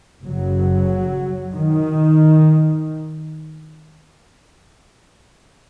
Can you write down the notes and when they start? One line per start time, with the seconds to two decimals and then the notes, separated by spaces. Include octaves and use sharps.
0.23 F#1 F#2 C#3 F#3
1.55 D#3